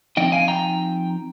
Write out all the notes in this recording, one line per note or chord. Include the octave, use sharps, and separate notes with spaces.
F3 C4 D#4 D#5 G5
F5 G#5
G5 A#5